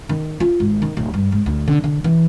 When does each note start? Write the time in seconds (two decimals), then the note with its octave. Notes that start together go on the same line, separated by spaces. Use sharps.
0.09 D#3
0.40 F4
0.60 G#1
0.82 D#3
0.97 D1
1.14 G2
1.32 G#2
1.46 D2
1.68 D3
1.84 D3
2.04 E3